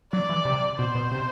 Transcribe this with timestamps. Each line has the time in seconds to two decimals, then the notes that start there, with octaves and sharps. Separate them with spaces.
0.12 F#3 D5
0.29 E3
0.45 C3
0.78 B2 C5
0.95 B2
1.11 C3